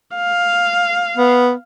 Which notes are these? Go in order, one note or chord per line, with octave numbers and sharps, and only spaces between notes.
F5
B3